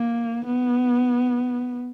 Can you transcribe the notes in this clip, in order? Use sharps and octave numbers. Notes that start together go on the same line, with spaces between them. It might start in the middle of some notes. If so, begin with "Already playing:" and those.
Already playing: A#3
B3